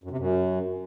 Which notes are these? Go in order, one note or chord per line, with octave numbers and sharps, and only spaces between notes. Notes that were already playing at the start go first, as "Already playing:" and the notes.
F#2
C3
F#2